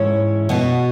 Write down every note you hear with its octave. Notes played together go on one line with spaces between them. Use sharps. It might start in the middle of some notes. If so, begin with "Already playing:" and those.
Already playing: G#2 E3 C#4 E4 C#5
B2 B3 F#4